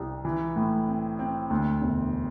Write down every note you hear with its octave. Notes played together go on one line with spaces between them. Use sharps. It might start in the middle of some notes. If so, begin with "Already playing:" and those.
Already playing: C2 C4
E3
A2
C4
C4
D2
E1